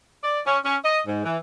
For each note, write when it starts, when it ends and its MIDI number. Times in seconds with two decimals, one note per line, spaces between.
0.23 0.40 74
0.46 0.58 61
0.65 0.77 61
0.84 1.00 75
1.07 1.24 44
1.25 1.38 52